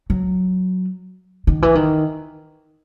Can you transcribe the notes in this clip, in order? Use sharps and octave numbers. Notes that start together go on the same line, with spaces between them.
F#3
D#3
E3
D#3